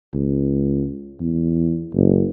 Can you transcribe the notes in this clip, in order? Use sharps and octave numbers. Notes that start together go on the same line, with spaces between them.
C#2
E2
F#1